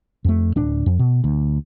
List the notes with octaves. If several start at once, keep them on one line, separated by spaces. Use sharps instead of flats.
F2 A3
D1 D4
F2
B2
D2